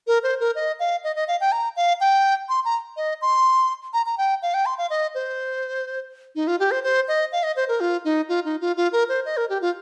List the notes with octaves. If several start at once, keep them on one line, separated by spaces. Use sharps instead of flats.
A#4
C5
A#4
D#5
F5
D#5
D#5
F5
G5
A#5
F5
G5
C6
A#5
D#5
C6
A#5
A#5
G5
F5
G5
C6
F5
D#5
C5
D#4
F4
G4
C5
C5
D#5
F5
D#5
C5
A#4
F4
D#4
F4
D#4
F4
F4
A#4
C5
D#5
A#4
G4
F4